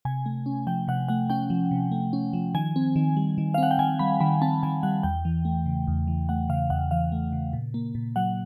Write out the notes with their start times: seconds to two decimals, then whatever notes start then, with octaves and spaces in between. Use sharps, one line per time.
0.05 C3 G#5
0.26 A3
0.46 C#4
0.67 F3 G5
0.88 C3 F#5
1.08 A3 F#5
1.30 C#4 G5
1.50 F3
1.71 C3
1.92 A3
2.13 C#4
2.33 F3
2.54 D#3 G#5
2.76 C4
2.96 D#3
3.17 G3
3.38 D#3
3.54 F5
3.58 C4 F#5
3.71 G5
3.79 D#3 G#5
3.99 G3 B5
4.20 D#3 B5
4.42 C4 A5
4.63 D#3 G#5
4.83 G3 F#5
5.03 E2 G5
5.25 E3
5.45 A3
5.66 C#3
5.87 E2
6.07 E3
6.29 A3 F#5
6.49 C#3 F5
6.70 E2 F#5
6.91 E3 F5
7.12 A3
7.32 C#3
7.53 A#2
7.74 A#3
7.95 A#2
8.16 F#3 F#5